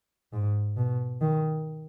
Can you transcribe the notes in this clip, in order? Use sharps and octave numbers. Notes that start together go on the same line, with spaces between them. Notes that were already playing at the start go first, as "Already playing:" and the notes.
G#2
B2
D#3